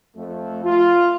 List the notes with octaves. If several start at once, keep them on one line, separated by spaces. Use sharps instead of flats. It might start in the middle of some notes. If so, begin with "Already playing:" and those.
F2 A3
F4